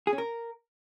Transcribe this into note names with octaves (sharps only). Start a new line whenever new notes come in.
G#4
C#4
A#4